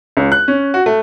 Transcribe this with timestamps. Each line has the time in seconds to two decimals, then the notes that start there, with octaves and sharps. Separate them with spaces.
0.17 C#2
0.32 F#6
0.48 C#4
0.74 F#4
0.86 A3